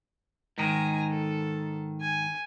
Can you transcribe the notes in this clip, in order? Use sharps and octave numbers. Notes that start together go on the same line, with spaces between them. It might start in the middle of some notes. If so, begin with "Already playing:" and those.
G#2 D#3 G#5 A#5
A4
G#5